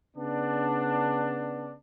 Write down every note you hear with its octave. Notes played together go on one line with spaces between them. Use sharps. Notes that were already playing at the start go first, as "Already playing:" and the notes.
C#3 B3 D4